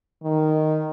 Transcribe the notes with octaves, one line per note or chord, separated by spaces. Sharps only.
D#3